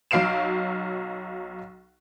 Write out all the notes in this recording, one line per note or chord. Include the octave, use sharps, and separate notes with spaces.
B1 F#3 F5 C7 D7 E7